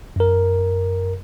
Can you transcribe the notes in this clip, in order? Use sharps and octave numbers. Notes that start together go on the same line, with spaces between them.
F#2 A#4